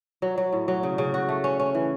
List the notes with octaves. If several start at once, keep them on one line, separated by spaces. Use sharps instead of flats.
F#3
F#3
A2
F#3
C#3
C#3
F#4
A3
C#4
C#4
E3